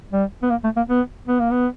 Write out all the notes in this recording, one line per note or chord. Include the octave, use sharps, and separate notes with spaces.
G3
B3
A#3
A3
A#3
B3
B3
A#3
B3